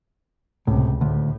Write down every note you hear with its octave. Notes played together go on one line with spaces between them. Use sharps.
C#2 A2 C3
D2 A2